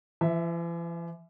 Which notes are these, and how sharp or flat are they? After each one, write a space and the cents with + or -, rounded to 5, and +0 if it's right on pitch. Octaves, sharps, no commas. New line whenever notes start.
E3 +45 E5 +0